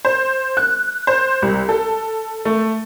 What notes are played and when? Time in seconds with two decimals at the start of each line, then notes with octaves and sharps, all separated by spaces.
0.05 C5
0.57 F#6
1.07 C5
1.42 C2
1.69 A4
2.45 A3